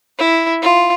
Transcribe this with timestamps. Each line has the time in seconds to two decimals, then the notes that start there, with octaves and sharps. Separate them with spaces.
0.19 E4
0.62 F4